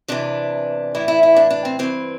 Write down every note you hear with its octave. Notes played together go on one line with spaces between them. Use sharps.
E2 C3 E3 D4
A2 E3 E4
E4
E4
D4
D4
C4
G2 E3 C4